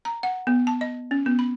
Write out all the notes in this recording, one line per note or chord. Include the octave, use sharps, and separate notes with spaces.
A#5
F#5
B3
A5
D#5
C#4
B3
B5